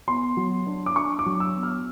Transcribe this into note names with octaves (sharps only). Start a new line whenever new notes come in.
B3 C6
F#3
D4
D6
D4 C#6
D6
F#3
E6
B3
F6